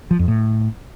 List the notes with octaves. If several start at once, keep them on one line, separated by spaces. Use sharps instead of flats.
F3
F2
A2